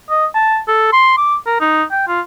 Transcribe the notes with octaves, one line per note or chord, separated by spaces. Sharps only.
D#5
A5
A4
C6
D6
A#4
D#4
G5
F4